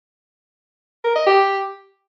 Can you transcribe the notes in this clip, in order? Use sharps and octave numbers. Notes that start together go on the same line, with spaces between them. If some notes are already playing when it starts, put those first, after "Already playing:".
A#4
D#5
G4